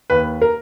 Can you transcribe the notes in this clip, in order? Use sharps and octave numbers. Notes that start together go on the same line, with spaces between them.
D#2 B4
A#4